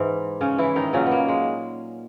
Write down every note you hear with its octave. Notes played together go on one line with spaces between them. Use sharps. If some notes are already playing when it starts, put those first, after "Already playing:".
Already playing: G#2 E3
C#3 C#4
E3 E4
D#3 D#4
A#2 C#3 F#3 C#4
B3
A#3
G#3